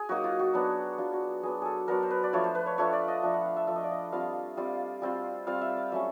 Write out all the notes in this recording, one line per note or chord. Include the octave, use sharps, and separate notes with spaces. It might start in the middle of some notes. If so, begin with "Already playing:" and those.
Already playing: G#4
F#3 A#3 D#4 F#4
F4
F#4
F#3 B3 D4
F#3 B3 D4 F4
F#4
F#3 B3 D4 G#4
G#4 A4
F#3 B3 D4 A#4
C5
B4
D5
F3 A3 D4 F4 C#5
C5
B4
C#5
F3 A3 D4 F4 C#5
D5
D#5
F3 A3 D4 F4
F#5
F5
E5
F3 A3 D4 F4 E5
D#5
D5
D#5
G3 C4 F4 F5
G3 C4 F4
G3 C4 F4
G3 C4 F4 F5
E5
F5
F#3 A3 C#4 E5